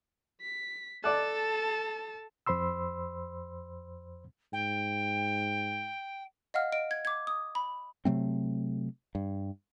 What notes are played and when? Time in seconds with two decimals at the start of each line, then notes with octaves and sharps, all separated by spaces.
0.41 B6
1.04 A4 D5 A5 D6 F#6
2.46 F2 C5 B5 C6 E6
4.53 G#2 G5
6.54 D#5 F5 F#5 F6
6.72 D#5 D7
6.91 G#6
7.05 D6 G#6
7.27 D#6
7.55 B5
8.05 C3 F#3 A3 C4
9.15 G2